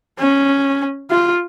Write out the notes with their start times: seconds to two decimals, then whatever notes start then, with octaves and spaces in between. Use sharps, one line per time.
0.19 C#4
1.11 F4